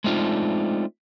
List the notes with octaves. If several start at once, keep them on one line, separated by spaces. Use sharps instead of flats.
G#3 A3 C4 D4 D#4 F4